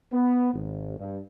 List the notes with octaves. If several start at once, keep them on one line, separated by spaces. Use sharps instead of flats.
B3
G#1
G2